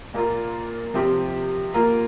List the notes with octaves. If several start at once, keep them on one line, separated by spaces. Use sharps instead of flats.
A#2 A#3 F4
C3 F3 C4 G4
A#3 F4 A#4